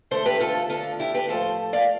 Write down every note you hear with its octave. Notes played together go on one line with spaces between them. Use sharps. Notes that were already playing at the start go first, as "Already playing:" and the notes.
E2 D3 A3 A4 C5
G4 B4
F4 A4
D2 D3 G3 F4 A4
E4 G4
G4 B4
A2 F3 A3 A4 C5
D5 F5